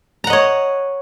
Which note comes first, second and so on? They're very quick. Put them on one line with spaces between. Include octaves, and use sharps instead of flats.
A#5 F#5 D#5 C#5